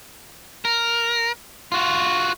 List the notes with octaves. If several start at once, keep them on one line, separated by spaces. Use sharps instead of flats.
A#4
F4 F#4